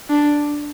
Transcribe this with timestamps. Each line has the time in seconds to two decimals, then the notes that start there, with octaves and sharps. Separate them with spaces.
0.10 D4